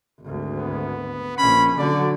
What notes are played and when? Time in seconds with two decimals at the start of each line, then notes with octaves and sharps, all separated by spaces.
0.22 G#1 D2
0.58 B3
1.38 A#1 C#4 B5
1.78 D3 F#3 D5